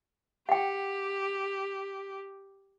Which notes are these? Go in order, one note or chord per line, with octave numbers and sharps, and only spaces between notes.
G4 F#5 G5